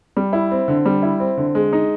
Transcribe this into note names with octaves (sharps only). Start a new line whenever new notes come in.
G3
E4
C4
D3
G3
E4
C4
D3
G#3
D#4